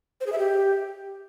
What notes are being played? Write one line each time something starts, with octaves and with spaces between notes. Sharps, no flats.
C5
G#4
E5
G4